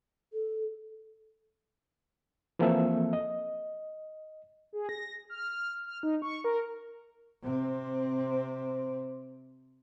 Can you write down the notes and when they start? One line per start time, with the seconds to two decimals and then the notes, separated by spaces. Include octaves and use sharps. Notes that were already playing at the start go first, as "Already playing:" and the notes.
0.33 A4
2.59 E3 F3 A#3 C4 A4 E5
3.13 D#5
4.73 G#4
4.89 A#6
5.30 F6
5.49 F6
5.85 F6
6.03 D#4
6.22 C#6
6.44 A#4
7.42 C3 C4